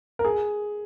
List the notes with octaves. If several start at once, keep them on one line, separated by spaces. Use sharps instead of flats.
A#4
G#4